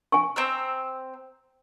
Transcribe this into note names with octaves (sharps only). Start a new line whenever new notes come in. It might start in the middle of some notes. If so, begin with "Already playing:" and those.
G#5 C#6
C4 A#5 E6